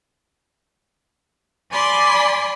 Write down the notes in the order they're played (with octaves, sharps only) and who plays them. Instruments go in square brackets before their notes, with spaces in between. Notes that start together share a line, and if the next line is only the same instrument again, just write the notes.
[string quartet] D5 G#5 B5 C6 D6